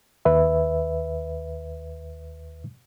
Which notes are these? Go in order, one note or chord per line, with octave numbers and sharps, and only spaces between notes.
D#2 B4 E5